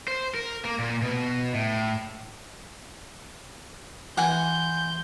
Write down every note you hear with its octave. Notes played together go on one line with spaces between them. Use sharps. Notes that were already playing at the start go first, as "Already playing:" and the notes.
C5
A#4
A#3
A#2
B2
A2
E3 F#5 G#5 C6 G6